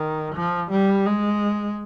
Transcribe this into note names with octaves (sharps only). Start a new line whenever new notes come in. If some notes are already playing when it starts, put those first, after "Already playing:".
Already playing: D#3
F3
G3
G#3